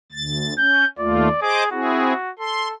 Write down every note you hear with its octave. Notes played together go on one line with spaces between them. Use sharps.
D2 A6
C#4 G6
D#2 A3 F4 D5
G#4 C5 D#5 D6
C4 E4 F#4 G#4
A4 C6